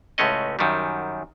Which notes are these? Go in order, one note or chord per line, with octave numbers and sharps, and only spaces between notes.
C#2 A2 G#3 A3 C#4 D#5
F#2 D#3 F#3 G3